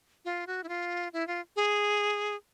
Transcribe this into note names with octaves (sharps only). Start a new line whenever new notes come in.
F4
F#4
E4
F4
E4
F4
G#4